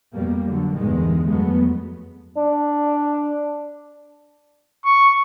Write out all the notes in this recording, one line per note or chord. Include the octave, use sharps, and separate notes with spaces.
F2 B2 G3 A#3
D3 F#3
G1 E2 G2 D#3 G#3
F2 F#3 G#3 A3 B3
D4
C#6